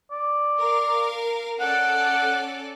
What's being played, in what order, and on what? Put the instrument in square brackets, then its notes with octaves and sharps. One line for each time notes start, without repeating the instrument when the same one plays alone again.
[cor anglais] D5
[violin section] A#4 F5
[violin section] C#4 A4 D5 [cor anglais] F#5